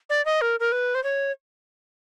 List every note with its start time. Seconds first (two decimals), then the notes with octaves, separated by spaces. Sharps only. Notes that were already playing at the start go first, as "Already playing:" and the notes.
0.10 D5
0.25 D#5
0.41 A#4
0.60 A#4
0.72 B4
0.95 C5
1.04 C#5